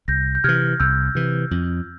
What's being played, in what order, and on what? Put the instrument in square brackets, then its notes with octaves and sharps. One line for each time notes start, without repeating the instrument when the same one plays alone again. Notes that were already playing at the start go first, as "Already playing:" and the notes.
[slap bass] C2 [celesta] G6 A#6
[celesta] G6
[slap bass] C3 E3 [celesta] F6 G#6
[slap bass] C2 [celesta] E6 G6
[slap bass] C3 E3
F2